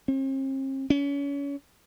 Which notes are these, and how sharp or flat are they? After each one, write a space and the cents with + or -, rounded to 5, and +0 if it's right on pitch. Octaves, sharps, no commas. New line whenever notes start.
C4 +45
C#4 +30